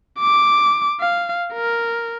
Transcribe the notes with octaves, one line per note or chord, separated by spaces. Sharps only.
D6
F5
A#4